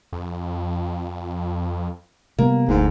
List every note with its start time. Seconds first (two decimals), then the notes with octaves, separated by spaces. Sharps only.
0.13 F2
2.39 C3 G3 A#3 B3
2.69 F1 D2 G#2